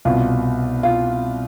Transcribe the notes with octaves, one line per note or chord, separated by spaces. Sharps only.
C2 B2 F4
F4